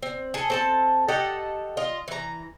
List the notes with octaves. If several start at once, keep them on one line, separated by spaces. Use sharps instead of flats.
C4
G#4 A4
C4 A4 A5
G4 A4 D#5 F#5
F4 D#5
E3 A#5